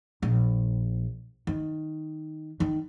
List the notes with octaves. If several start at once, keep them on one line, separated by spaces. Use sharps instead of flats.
A#1
D#3
D#3